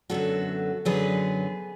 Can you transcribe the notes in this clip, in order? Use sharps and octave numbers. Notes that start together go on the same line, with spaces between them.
F#2 D3 F#3 B3 F#4 A4
F#2 D3 F#3 B3 G#4 B4